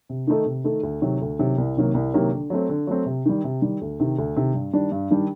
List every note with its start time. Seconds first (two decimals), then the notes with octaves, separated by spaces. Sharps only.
0.09 C3
0.27 D#3 A3 D#4 A4
0.46 C3
0.64 D#3 A3 D#4 A4
0.83 D2
1.02 C3 D#3 F#3
1.21 D2
1.39 C3 D#3 F#3
1.58 C2
1.77 C3 D#3 F#3 A#3
1.94 C2
2.14 C3 D#3 F#3 A#3
2.33 D3
2.50 F#3 A3 C4
2.69 D3
2.87 F#3 A3 C4
3.06 C3
3.26 D#3 G3
3.44 C3
3.62 D#3 G3
3.81 D2
4.00 C3 D#3
4.18 D2
4.36 C3 D#3
4.54 G2
4.73 D#3 G3 D4
4.92 G2
5.11 D#3 G3 D4